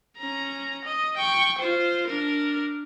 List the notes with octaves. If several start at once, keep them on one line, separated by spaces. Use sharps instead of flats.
C#4 A#5
D#5
G5 C#6
F4 C5
D4 A#4